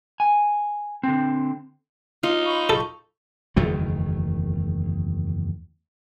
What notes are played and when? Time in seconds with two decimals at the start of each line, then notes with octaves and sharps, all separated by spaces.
0.20 G#5
1.03 D3 C4
2.23 D#4 F4
2.45 B5 C#6 G6
2.70 A4
3.56 F#1 E2 D#3 A3